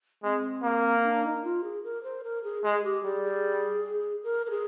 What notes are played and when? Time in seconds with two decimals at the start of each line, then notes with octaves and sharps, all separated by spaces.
0.23 G#3 C4
0.63 A#3
1.04 D4
1.24 D#4
1.44 F4
1.64 G#4
1.84 A#4
2.03 C5
2.24 A#4
2.44 G#4
2.64 G#3 G#4
2.84 G4
3.04 G3 G#4
3.24 G#4
4.24 A#4
4.46 A#4
4.50 G#4